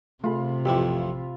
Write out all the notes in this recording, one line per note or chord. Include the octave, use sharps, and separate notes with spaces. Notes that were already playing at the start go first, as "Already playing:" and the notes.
C3 A3 F4 G#4 B5
A1 F2 E4 F4 G4 E5